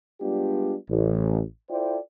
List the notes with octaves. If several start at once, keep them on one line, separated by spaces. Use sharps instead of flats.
G3 G#3 B3 D4 F4 G4
A1
E4 F4 A4 C5 D5 G5